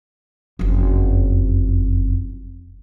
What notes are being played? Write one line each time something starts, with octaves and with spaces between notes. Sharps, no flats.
F#1 F2